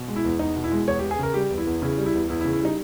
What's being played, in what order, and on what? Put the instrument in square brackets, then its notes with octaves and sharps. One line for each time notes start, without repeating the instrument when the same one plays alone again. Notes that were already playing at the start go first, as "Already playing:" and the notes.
Already playing: [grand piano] B2
G#3
E4
E2
E2 D#4
B2
E4
G#3
E2 C#5
G4
E2
G#4
C#3 A#4
G3 G4
E2
E4
E2
C#3 E4
G3
E4
E2
E2 E4
E4
C#3
E4
G3 D#4